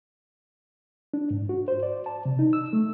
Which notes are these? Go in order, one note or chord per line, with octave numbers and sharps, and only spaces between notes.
D4
G#2
F#4
C5
D5
A5
C3
D#4
E6
A3